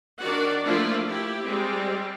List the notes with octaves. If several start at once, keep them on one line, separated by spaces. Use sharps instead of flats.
D#3 D4 F#4 A#4 D5 F#5
F3 A3 A#3 D4 E4 F4
E4 G4
G3 G#3 C4